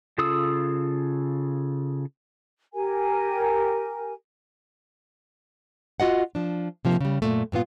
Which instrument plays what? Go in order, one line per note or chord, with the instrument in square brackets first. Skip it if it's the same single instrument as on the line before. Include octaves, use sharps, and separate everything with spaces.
[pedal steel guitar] C#3 F4 A4 D#6 E6
[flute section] G4 A#4 G#5
[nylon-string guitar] F4 F#4 D#5 F#5
F3 D4
C3 F3 A#3
C#3 G3
F#2 A#2 A3
G2 A#2 B3 F4